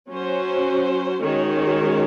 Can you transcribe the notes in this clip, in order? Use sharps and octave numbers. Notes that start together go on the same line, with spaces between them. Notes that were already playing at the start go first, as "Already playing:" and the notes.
F#3 C#4 F#4 C5
D#3 G#3 C#4 F#4 C#5